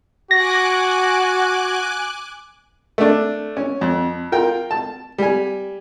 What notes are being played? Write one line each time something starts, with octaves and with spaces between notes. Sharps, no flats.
F#4 G#5 D6 F#6 A#6
A3 D4
C#4
F2
F4 A#4 G5
A5
G3 G#5